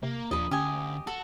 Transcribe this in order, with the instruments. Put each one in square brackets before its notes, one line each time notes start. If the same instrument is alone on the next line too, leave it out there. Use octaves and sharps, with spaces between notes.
[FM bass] C3 [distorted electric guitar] A#3
[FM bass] D#2 [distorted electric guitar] F3 D4 [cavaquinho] D#5 B5
[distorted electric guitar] D2 [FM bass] C#4 [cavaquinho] G4 D#5 G#5
[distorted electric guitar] F#4 [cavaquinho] A4